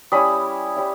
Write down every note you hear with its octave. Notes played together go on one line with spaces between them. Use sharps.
G3 C#4 E4 B5 D#6
G3 C#4 E4